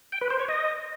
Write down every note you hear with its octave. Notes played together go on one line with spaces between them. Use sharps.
G5
B4
C5
C#5
D#5